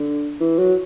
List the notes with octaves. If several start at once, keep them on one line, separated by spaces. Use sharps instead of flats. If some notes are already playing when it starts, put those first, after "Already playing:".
Already playing: D3
E3
F#3